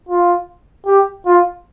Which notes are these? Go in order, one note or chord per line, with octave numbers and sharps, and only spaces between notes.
F4
G4
F4